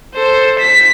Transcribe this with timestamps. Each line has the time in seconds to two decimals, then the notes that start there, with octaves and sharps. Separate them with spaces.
0.15 A4 C5
0.60 B6